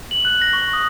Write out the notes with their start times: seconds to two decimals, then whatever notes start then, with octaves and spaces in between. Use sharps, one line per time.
0.11 F#7
0.25 F#6
0.42 A#6
0.53 C#6
0.73 D#6